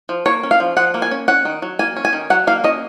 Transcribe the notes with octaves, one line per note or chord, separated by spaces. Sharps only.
F3
A#3 C#5
C#4
F5
F3
F3 F#5
A#3
G#5
C#4
C#4 F#5
D#3
F#3
A#3 G#5
C#4
G#5
D#3
F#3 F#5
A#3 F5
C#4 D#5